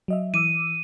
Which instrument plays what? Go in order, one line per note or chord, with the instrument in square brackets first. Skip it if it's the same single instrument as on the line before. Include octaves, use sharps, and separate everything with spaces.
[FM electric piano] F#3 D#5 E5
[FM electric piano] E3 D6 E6 [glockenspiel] D#7